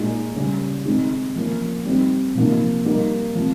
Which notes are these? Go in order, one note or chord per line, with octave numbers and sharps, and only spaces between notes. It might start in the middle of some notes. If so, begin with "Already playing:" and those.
Already playing: A#2 G#3 D#4
C#3 G3 C#4
D#3 G#3 C4 D#4
F3 A#3 C#4
G3 C4 D#4
C3 F3 A#3 D#4
G3 A#3 D#4
F3 C4